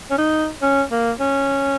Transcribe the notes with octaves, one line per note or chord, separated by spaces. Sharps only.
C#4
D#4
C#4
A#3
C#4